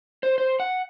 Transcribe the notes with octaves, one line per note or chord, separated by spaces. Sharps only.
C5
C5
F#5